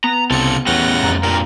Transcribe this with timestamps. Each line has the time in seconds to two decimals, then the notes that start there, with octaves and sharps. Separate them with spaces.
0.04 B3 A#5
0.31 C2 C#3 C4 A4 C#7
0.67 E2 G3 A3 C#4 F#5 A#6
1.03 F2 A#5
1.23 G2 A#2 A#4